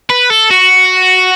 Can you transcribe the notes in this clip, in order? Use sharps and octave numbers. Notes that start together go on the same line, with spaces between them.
B4
A4
F#4